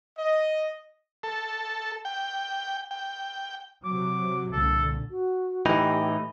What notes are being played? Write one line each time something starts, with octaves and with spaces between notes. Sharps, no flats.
D#5
A4
G5
G5
C3 F#3 D6
C2 A#2 D3 A4
F#4
A2 E3 D#4 G4 B5